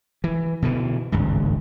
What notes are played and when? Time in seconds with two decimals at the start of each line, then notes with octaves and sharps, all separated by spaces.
0.24 E3
0.62 B2 D3 E3
1.12 D1 G#1 C#2 G2